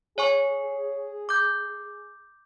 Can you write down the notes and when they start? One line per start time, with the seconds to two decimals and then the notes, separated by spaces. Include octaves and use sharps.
0.18 G#4 C#5 G#5 C#6
1.29 D6 G6